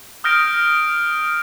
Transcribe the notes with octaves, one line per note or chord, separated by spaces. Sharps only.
D#6 F6 G6 A#6 D7